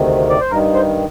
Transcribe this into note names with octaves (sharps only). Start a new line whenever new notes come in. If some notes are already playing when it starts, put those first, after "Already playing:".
Already playing: D2 C3 D#3
D5
C5
G2 D#3 A#4
C5